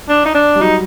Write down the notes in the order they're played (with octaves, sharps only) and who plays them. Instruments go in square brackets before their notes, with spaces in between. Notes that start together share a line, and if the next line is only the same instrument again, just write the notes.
[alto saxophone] D4
D#4
D4
[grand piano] G3
[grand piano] F#3 [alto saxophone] D#4